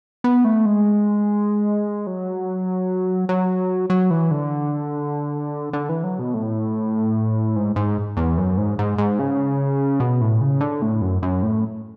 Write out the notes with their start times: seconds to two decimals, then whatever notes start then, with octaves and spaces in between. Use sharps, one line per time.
0.24 B3
0.45 A3
0.66 G#3
2.07 F#3
3.29 F#3
3.90 F#3
4.11 E3
4.31 D3
5.73 D3
5.89 E3
6.04 F#3
6.19 B2
6.34 A2
7.56 G#2
7.76 G#2
8.17 E2
8.38 F#2
8.57 G#2
8.79 G#2
8.98 G#2
9.19 C#3
10.00 B2
10.21 A2
10.41 C#3
10.61 D3
10.82 A2
11.01 F#2
11.22 F#2
11.43 A2